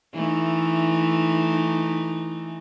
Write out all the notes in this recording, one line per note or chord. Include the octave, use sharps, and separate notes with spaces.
E3 A3 D#4